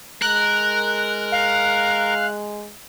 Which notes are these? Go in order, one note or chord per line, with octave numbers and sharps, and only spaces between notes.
G#3 A#4 F#6
F5